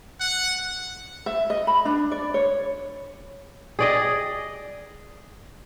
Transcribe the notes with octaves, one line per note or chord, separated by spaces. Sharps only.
F#5
E5
D#5
B5
D4
D5
C#5
G#4 D5 D#5